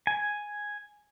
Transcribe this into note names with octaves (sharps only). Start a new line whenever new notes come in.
G#5